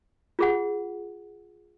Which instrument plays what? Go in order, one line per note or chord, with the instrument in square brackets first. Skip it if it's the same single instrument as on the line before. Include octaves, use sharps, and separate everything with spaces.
[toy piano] F4 G#4 F#5